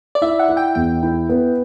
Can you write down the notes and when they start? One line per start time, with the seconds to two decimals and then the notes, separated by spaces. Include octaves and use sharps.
0.15 D5
0.22 E4 E5
0.39 F#5
0.49 E4
0.57 G5
0.75 E2 G5
1.03 E4
1.29 B3